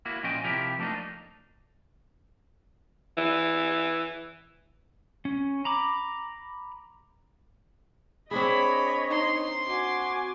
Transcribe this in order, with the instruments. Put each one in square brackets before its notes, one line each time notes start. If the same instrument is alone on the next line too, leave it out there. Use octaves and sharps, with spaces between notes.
[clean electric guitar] A#3 E4 F#4
A#2 F3 C#4 F4 D#5 G5
C3 F3 E4 G4 A#4
F3 A3 A#3 D4 D#4
[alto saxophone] E3
[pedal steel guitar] C#4
A#5 B5 D6
[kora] C4 D4 G#4 [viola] C#5 D#5 [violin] B5
[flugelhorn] D#4 [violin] C6
[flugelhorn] F#4 [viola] G#5 D6